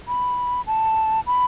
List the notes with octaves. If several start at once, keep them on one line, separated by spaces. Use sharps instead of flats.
B5
A5
B5